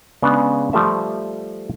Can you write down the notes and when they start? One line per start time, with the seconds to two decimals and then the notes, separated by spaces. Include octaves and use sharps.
0.22 C#3 G#3 B3 D4
0.73 F3 G3 A3 E5